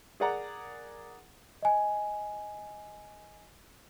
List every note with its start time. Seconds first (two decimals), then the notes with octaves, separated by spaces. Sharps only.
0.20 G#4 A#4 D5 F#5 A#5
1.63 D#5 G#5